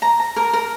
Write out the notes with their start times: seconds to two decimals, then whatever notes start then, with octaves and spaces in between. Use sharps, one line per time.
0.02 A#5
0.20 A#5
0.36 A#4
0.53 A#4